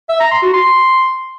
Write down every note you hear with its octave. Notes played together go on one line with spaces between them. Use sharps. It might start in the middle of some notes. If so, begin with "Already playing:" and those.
E5
A#5
C6
F#4
C6